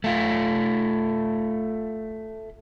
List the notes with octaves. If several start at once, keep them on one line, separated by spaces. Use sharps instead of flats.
A3 F4